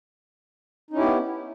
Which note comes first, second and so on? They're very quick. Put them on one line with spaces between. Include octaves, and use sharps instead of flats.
D#4 C#4 E4 G4 B3